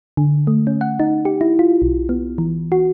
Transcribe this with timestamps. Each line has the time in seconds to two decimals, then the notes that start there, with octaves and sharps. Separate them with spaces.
0.17 D3
0.47 A3
0.67 C#4
0.81 F#5
1.00 D#4
1.25 G4
1.41 E4
1.59 F4
1.82 B1
2.09 B3
2.38 E3
2.72 F#4